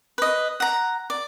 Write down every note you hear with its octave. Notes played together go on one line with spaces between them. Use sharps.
B4 D#5
F#5 A#5
D5